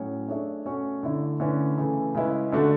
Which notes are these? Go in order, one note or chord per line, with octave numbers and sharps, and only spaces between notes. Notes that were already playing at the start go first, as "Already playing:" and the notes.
Already playing: A2 F#3 C#4 F#4 C#5
A3 D4 G#4 C#5 E5
B2 A3 C#4 F#4 C#5
D3 A3 E4
D3 A3 C#4 E4 B4
C#3 E3 A3
C#3 G#3 C#4 E4 B4
D3 A3 D4 F#4 A4